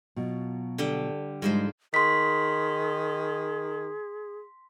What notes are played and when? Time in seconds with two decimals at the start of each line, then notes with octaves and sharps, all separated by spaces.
0.16 B2 F#3 F4
0.78 D3 G3 G5
1.42 G#2 F3 G3 G#3 C5
1.94 D#3 G#4 C6 B6